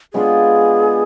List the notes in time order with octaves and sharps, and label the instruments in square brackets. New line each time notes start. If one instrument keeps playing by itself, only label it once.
[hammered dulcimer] G#3 B3 D4 F4 [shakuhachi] G#4